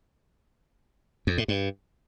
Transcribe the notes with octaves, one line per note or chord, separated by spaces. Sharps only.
F2
A2
G2